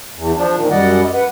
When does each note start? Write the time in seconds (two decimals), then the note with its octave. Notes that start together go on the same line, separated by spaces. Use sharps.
0.16 E2
0.36 F3 D4
0.56 A#2 D#3
0.71 F#2 G3 D5 D#5 F#5
1.13 B4 F#5